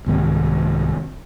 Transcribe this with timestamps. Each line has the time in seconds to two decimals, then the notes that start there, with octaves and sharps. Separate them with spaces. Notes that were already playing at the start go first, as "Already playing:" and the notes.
0.06 C2 G#2 D#3 C4